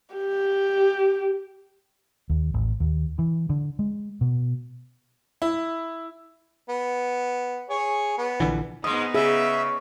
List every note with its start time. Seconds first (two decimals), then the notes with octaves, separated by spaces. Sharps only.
0.15 G4
2.30 D#2
2.54 A1
2.80 D#2
3.19 E3
3.50 D3
3.79 G#3
4.21 B2
5.42 E4
6.69 B3
7.70 G#4 C#5
8.18 B3
8.40 A#1 D3 E3
8.84 G#2 G#3 B3 D#4 D#6
9.14 C#3 G#4 E5